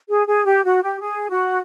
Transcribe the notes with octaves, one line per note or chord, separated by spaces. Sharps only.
G#4
G#4
G4
F#4
G4
G#4
F#4